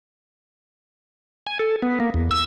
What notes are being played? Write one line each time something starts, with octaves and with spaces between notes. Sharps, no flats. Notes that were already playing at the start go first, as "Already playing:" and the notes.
G#5
A4
B3
A#3
E2
E6